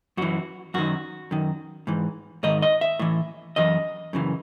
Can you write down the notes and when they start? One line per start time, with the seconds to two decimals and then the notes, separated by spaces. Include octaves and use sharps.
0.17 F#2 E3 F#4
0.74 F#2 D#3 F#4
1.31 F#2 D#3
1.87 G#2 E3
2.43 G#2 D#3 D#5
2.62 D#5
2.81 E5
2.99 A2 E3
3.56 F#2 E3 D#5
4.13 F#2 C#3 E3